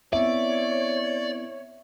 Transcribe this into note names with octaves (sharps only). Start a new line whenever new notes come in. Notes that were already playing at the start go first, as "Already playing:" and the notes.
B3 C4 E4 C#5 D5 E5